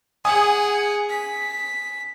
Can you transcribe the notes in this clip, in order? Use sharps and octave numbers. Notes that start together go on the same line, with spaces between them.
G#4 F#5 G#5 D#6
B6